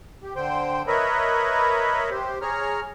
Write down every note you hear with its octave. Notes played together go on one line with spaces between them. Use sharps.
G4
D3 C5 G5
A#4 B4 C#5 D#5 E5 B5
G4 C5
G#4 C#5 A#5 F6